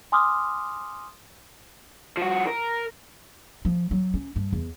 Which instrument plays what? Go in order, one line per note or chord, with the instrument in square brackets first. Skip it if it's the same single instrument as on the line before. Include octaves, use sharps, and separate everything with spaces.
[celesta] G#5 C6 D6 D#6 F6
[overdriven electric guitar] F3 F#4
A#4
[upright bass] F3
F#3
C#4
G2
E2